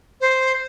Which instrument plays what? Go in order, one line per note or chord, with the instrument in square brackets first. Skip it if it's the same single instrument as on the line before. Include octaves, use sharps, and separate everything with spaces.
[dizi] C5